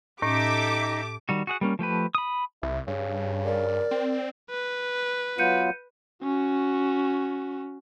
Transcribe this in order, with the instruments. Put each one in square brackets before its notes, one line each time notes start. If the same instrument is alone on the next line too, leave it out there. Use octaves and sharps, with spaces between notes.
[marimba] A2 C#4 [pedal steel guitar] D#4 [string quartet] G4 A4 E5 [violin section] D6
[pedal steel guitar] D#3 G3 F#4
F#4 G#4 F#5
G3 A#3 C#4
F3 A3 G4 B4
B5 D#6
[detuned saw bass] C2 [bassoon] E4
[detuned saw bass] G2 [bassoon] C#3
[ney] A#4 [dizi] D5
[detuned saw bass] C4
[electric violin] B4
[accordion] F#3 B3 F4 [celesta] G6 C#7 D#7
[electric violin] C#4 F#4